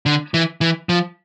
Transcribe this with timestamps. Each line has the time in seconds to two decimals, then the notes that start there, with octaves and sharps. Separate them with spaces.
0.06 D3
0.34 E3
0.61 E3
0.89 F3